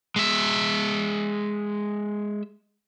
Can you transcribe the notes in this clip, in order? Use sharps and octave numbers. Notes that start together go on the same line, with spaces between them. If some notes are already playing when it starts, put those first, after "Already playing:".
G#3 E5